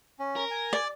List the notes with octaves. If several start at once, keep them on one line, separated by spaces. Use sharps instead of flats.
C#4
A#4
G#5
D5